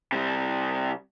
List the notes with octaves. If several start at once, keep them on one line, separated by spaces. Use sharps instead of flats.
C3 G3